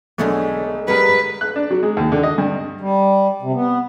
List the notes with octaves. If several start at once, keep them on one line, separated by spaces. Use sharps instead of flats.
B1 D3 G#3 A3 C#5
G3 G#3 A#4 B4 F#5
F#6
D4
F#3
G#3
D#2
D3
D#5
G2
G3
C3
B3